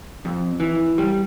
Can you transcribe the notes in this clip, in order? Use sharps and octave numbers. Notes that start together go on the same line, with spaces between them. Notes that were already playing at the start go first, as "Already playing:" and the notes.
F2
E3
G3